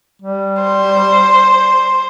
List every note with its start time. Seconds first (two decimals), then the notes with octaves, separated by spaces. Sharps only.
0.22 G3
0.62 C5